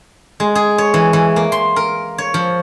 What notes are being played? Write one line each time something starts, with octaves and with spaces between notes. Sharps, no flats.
G#3
G#4
C#5
E3
E3
A#3
C6
A#4
C#5
F3